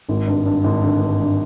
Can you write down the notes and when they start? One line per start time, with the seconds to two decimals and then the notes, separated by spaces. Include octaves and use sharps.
0.09 G#1
0.27 G2
0.46 G2
0.64 G#1
0.82 D3
1.01 G2
1.20 G2